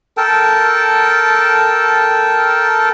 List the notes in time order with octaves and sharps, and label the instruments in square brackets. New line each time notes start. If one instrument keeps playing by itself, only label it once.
[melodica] A4 A#4 G5 A5